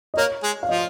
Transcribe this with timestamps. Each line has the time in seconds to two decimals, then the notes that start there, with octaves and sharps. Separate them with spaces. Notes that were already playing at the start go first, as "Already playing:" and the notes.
0.14 D#5
0.17 A#3 A#4 C#5
0.43 G#3 G#4
0.63 F5
0.69 F3 F4 D#5